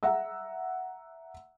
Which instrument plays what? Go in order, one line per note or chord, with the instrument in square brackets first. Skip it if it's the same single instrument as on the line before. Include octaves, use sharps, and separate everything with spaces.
[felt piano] E5 F#5 A#5 E6